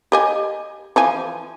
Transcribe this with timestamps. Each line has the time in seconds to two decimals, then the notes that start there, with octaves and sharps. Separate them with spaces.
0.12 G4 D#5 G#5
0.96 E3 F3 G#5